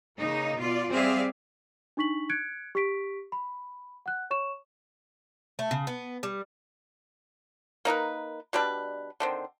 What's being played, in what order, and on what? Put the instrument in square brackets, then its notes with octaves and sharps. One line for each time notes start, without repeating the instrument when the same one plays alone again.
[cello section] C#3 A#3 D#4
B2 F4 D5
G3 C4 G#4 D5 E5 F5
[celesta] D4 D#4 C#6 B6 F#7
F#6 G#6 C#7 D7
G4 C#6 B6 D7
B5
F#5 F#6
C#5 C#6 E7
[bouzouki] A3
C#3
B3
G3
[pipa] A#3 D#4 A#4 B4
B2 G3 D4 B4
D3 D#3 C4